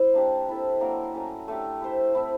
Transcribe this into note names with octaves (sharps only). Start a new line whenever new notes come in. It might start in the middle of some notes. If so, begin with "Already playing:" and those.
Already playing: E4 C5
A#3 D4 G4
C4 E4 A4
F#3 A#3 D4 F#4
F#3 A3 C#4
A3 D4 G4
E4 G4 C5 E5
A3 C4 E4